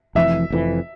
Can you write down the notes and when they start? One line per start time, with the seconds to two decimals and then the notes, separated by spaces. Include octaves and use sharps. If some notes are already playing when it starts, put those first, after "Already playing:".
0.15 F1 F2 E3 E5
0.50 F1 F2 E3